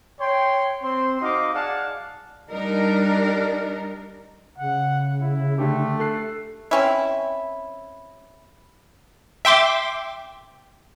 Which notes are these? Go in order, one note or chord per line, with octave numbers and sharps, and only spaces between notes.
C#5 G5 C6
C4 C5 C6
D#4 F#4 D#5 F5 F#5 D6
G#4 D5 F5 F#5 G#5 A5
G3 D4 D#4 A#4
C#3 F#5
E4
D3 A3 G4
A4 F#6 C7
C4 C#4 E4
E5 G5 C6 D6